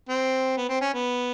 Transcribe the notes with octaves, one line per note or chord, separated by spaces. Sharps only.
C4
B3
C4
C#4
B3